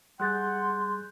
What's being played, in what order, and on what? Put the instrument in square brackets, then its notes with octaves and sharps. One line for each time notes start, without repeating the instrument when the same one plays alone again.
[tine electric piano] G3 G#4 A6 [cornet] F#5 [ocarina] C6 [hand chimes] F#6 G6